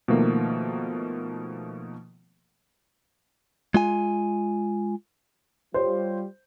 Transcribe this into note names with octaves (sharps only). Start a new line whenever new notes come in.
B2 D#3 F3 A3 A#3
G#3 F4 G#5
G3 F4 C5 C#5